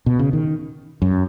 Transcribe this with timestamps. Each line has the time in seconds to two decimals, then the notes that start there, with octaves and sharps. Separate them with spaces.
0.06 B2
0.19 C#3
0.33 D#3
1.02 F#2